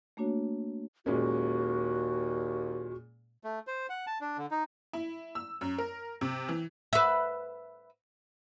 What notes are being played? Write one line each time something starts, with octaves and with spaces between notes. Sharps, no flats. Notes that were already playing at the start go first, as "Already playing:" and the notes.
A3 A#3 D4 F#4 C#5
D#2 A#2 G#3 C#4 F#4
A3
C5
F#5
A5
D4
D3
D#4
E4
E6
F#2
A#4
C3
E3
B4 E5